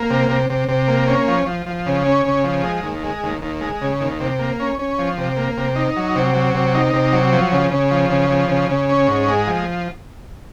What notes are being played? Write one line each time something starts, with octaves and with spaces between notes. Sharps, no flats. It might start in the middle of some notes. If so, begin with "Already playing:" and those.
Already playing: A#3
C3
C3
C3
C3
A#3
C#4
F3
F3
F3
C#3
C#4
C#3
F3
G#3
D#2
G#3
D#2
D#2
G#3
C#3
D#2
C3
A#3
C#4
C#4
F3
C3
A#3
C3
D#4
F#3
C3
F#3
C3
D#4
C3
F#3
F3
C#3
C#3
F3
C#3
F3
C#3
C#3
C#4
G#2
G#3
F3